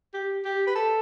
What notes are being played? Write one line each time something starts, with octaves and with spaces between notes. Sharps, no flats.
G4
G4
B4
A4